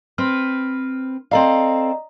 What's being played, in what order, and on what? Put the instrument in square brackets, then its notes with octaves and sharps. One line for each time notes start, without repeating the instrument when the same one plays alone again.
[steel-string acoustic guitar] C4 B4 [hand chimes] F6
[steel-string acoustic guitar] C4 A4 F5 [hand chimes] D5 D#5 A#5